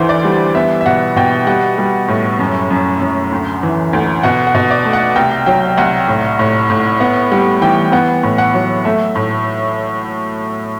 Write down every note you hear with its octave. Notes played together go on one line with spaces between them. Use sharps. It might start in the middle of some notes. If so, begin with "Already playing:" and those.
Already playing: D2 E3 C5
D5
G3
B3 E5
E5
B2 F#5
B2 G5
G3 F#5
G3
A2
F#2
F#2
F#2
D2
E3
D2
B2 F#5
F#5
B2
D5
A3
F#5
C2 G5
F#3 G5
C2 F#5
A2
A2
A2
B3 F#5
G3 F#5
E3 G5
B3 F#5
A2
F#5
F#3
A3 E5
A2